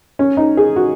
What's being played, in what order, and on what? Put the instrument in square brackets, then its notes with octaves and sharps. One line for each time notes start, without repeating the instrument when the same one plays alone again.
[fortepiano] C#4
D#4
G#4
F#4